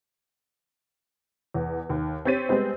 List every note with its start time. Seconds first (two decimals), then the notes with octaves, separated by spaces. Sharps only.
1.54 E2
1.89 D#2
2.25 C4 G4 C#5 A6 B6 D#7
2.49 G3 G#3 B3 C4